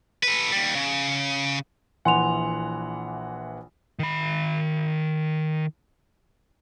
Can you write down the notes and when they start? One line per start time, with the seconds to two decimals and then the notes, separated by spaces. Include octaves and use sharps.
0.23 A4 B4
0.52 D#2 G3
0.75 C#3
2.05 A#1 E3 F#5 G#5 C6 F7
3.99 D#3 B5